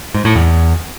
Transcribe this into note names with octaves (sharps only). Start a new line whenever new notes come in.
G#2
A2
E2